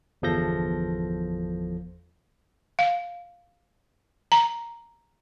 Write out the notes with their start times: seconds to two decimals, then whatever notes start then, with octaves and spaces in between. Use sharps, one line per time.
0.22 G1 E2 F3 A4 G6 A#6
2.79 F5
4.32 A#5